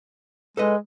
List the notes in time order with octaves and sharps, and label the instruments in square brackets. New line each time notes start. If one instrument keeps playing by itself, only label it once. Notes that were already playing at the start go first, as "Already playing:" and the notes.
[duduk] G#3 [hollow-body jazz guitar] A4 B4 D#5